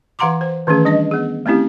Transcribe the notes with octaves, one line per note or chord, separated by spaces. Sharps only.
E3 F5 F#5 A#5 C6 D6
C5
D#3 E3 A3 C#4 G#4
G3 D4 D#5
B3 G#4
A3 C4 C#4 E4 G4